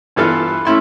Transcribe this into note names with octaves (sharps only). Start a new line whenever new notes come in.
G2 E3 B3 F4 A4 F6
A3 C#4 E4 C6